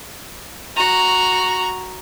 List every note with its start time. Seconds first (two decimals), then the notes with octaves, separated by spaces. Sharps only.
0.77 F#4 A#5